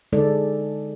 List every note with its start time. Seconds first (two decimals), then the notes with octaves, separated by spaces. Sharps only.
0.13 D3 G#3 D#4 A4 D5